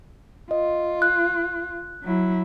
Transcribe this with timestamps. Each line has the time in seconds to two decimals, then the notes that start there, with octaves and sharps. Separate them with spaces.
0.51 F4 D#5
1.02 F#6
2.03 F#3 E4